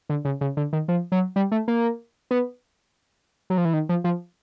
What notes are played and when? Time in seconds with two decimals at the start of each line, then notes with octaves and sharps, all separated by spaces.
0.09 D3
0.25 C#3
0.41 C#3
0.57 D3
0.73 D#3
0.88 F3
1.12 F#3
1.36 G3
1.52 A3
1.68 A#3
2.31 B3
3.50 F#3
3.58 F3
3.65 E3
3.73 D#3
3.89 F3
4.04 F3